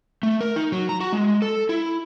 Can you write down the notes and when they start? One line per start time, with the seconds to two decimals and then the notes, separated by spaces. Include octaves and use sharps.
0.23 A3
0.40 A#4
0.56 D#4
0.72 F#3
0.89 A#5
1.00 F#4
1.13 G#3
1.42 A4
1.69 E4